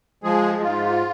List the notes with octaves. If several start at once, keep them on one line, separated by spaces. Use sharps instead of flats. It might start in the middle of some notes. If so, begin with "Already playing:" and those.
F3 G#3 G#4
G#2 F4